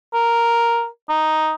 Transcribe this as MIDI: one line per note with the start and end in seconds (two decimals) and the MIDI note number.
0.14 0.87 70
1.09 1.54 63